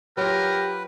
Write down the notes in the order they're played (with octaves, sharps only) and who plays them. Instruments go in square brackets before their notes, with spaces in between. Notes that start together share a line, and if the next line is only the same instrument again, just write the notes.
[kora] F#3 F4 [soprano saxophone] G4 [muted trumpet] A#4 [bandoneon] B4